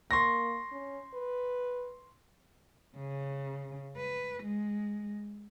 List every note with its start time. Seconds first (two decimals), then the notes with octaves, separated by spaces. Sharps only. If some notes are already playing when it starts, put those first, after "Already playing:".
0.11 A#3 C6 C#6 A#6
0.72 C#4
1.14 B4
2.97 C#3
3.97 B4
4.43 G#3